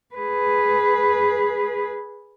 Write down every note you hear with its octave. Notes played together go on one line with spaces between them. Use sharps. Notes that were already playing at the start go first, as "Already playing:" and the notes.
G#4 B4